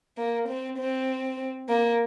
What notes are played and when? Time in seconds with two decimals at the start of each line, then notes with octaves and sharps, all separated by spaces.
0.18 A#3
0.48 C4
0.78 C4
1.69 A#3